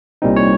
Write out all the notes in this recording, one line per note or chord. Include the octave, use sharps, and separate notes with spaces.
C2 A#2 G3 C4 D#4
C#5